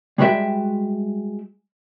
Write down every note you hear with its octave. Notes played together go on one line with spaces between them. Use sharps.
G3 G#3 F#4 B4 E5 G5